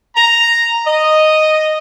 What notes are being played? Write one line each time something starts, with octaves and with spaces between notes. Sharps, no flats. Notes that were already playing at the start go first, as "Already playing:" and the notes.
A#5
D#5